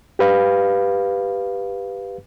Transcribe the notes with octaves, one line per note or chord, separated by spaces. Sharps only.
G4 B4 F5